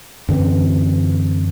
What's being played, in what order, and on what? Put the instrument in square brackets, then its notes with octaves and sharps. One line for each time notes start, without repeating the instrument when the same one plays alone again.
[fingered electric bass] F#2 D3 E3 C4